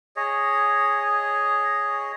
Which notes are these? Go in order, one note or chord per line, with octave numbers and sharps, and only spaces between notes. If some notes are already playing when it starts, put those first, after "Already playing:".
G#4 C#5 D#5